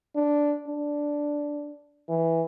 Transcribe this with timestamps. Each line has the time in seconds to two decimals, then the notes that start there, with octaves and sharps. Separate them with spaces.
0.15 D4
0.67 D4
2.09 E3